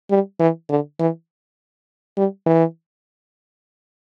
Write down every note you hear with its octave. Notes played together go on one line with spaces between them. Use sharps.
G3
E3
D3
E3
G3
E3